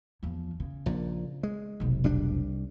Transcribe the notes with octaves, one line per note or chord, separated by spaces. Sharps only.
E2 F3
C#3
A#1 A#2
G#3
F1 B1
C2 G3 D4